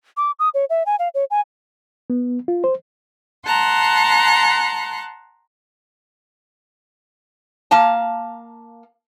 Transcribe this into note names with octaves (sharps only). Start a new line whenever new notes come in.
D6
D#6
C#5
E5
G#5
F5
C#5
G#5
B3
F4
C5
F#5 A5 A#5 C6 F#6
A#3 F5 A5 A#5